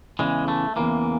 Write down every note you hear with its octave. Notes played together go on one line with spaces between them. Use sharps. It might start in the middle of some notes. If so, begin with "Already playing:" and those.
E2 C#3 E3 G#3
A3
E2 C#3 E3 A#3